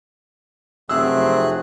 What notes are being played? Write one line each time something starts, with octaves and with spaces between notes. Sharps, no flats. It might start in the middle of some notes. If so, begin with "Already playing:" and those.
F1 F#2 A3 C4 G#4 E6 F#6